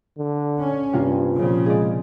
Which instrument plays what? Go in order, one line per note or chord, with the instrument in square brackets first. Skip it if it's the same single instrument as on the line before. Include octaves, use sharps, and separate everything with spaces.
[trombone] D3
[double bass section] C#4
[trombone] G2 [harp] C3 A#3 F4
[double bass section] A#2 C#3 F3
[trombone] G#3 [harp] G#4 D5